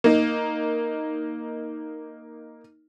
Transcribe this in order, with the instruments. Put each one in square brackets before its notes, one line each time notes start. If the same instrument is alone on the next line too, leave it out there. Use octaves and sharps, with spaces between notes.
[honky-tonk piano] A#3 D#4